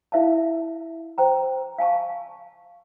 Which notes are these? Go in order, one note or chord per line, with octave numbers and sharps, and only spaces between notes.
E4 E5 F5 A5
C5 G5 A#5
F5 G#5 A5 C#6